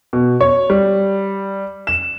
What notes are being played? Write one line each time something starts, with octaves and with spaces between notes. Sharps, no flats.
B2
C#5
G3
E7